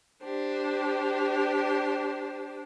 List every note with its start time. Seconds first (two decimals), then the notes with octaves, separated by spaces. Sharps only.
0.24 D4 G4 C5